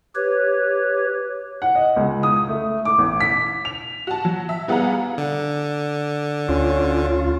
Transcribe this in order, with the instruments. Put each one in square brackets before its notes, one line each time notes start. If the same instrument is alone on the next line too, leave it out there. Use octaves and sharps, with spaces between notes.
[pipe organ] G4 B4 C#5
[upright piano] F#5
D#5
C#2
D#6
A3
D6
A1
B6
F7
[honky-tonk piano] F#4 A5
F#3
E5
G3 B3 G#4 F5 F#5 A#5
[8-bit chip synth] D3
[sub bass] D2 [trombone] C#4 [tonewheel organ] F4